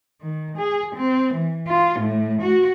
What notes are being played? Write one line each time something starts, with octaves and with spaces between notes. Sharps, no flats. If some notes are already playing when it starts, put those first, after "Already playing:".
D#3
G#4
C4
E3
F4
A2
F#4